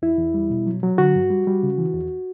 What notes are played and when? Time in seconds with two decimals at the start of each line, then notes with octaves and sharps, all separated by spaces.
0.02 E2 E4
0.18 E2
0.34 G3
0.50 B2
0.66 F#3
0.83 F#3
0.98 D3 F#4
1.15 G2
1.30 G3
1.47 G3
1.63 C#3
1.78 E3
1.94 E2